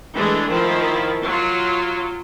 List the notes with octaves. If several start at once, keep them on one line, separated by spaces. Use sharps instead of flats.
E3 G#3 A3 D4
D#3 F3 E4
F#3 F4